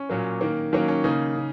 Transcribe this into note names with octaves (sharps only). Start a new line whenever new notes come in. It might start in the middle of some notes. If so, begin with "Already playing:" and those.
Already playing: C#4
A#2 F#3 A#3
D#3 A#3
D#3 F#3 A#3 C#4
C#4
C#3 A#3 D#4
C#3